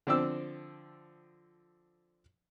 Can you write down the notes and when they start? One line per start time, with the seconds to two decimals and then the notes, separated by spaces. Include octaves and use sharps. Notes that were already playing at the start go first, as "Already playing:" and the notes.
0.07 D3 F3 C4 D5 G5 E6